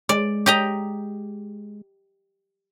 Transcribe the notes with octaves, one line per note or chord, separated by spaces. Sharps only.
G#3 D5
G4 D#5 A#5